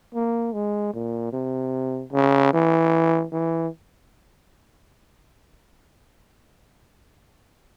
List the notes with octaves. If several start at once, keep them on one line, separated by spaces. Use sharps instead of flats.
A#3
G#3
A#2
C3
C#3
E3
E3